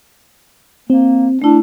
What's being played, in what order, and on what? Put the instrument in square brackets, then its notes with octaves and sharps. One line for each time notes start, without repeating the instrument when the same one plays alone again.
[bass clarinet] A#3 [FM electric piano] C4
[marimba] A3 E4 [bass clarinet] D4